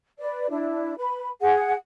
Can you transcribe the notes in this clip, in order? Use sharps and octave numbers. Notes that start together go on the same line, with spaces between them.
B4 D5
D4 E4
B4 B5
G#4 F#5